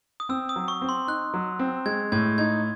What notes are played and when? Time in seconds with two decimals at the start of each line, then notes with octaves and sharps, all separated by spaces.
0.20 D#6
0.29 C4 E6
0.49 D#6
0.56 F#3
0.68 C#6
0.82 C4
0.89 C6
1.08 D#4 F#6
1.34 F#3
1.59 C4
1.86 G#3 G#6
2.12 A2 G#6
2.38 D#4 G#6